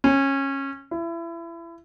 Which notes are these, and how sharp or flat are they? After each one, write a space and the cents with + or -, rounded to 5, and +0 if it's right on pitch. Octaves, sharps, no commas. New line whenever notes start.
C#4 -20
E4 +30